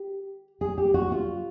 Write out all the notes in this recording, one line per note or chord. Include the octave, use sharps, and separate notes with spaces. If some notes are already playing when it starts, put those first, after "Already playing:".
Already playing: G4
G#4
G4
F#4
F4